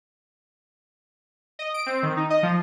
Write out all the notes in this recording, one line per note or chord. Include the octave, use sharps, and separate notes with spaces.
D#5
D7
C4
D#3
D#4
D#5
F3